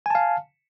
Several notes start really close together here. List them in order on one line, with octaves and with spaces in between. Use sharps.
G#5 A5 F5